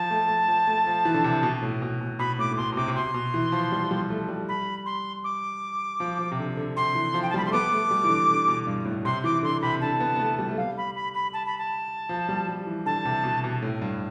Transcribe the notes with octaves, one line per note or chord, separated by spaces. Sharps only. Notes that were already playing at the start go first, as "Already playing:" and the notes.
Already playing: F3 A5
A3
A3
F3
A3
F3
E3
D3
C3
B2
A2
B2
B2
B2 B5
A2 D6
A2
B2 C6
B2
C3 D6
C3
B2 C6
B2
E3
F3
G3
F3
G3
A3
G3
B5
C6
D6
F3
F3
C3
D3
D3
C3 C6
E3
F3
G5
A5
G3 B5
A3 C6
B3 D6
A3
G3
E3
D3
D3
B2
G2
A2
C3 C6
E3 D6
D3 C6
C3 B5
D3 A5
B3
B3
A3
G3
A3
G3 F5
B5
B5
B5
A5
B5
A5
F3
G3
G3
E3
D3 A5
C3
B2
B2
A2
G2